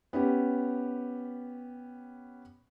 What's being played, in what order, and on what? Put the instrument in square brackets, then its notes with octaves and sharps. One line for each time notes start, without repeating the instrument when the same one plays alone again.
[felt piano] B3 C#4 G4